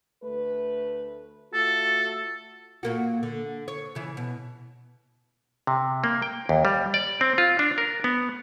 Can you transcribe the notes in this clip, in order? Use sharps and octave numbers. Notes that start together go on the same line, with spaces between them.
D2 A3 B4
A3 F4 F#4 A4
A#2 A#3 F#4
D3
C#5
C#3 E3
B2
C3
A#3
G5
D#2
G3
D5
C4
F4
D4
A#4
B3